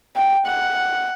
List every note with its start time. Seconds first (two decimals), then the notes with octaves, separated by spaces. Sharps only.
0.16 G5
0.46 F#5